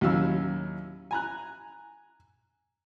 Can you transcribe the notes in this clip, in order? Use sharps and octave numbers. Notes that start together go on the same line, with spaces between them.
D#2 A2 F#3 C#4 F5 E6
G#5 A#5 F#6